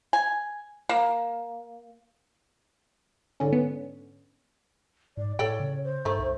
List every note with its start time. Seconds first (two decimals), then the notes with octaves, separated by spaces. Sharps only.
0.13 G#5
0.89 A#3
3.40 G#2 D3 C#4
3.53 B3
5.17 G#2 D5
5.39 A2 A4 C#5 D5 G5
5.60 C#3
5.84 C5
6.05 G2 D#3 A3
6.19 C2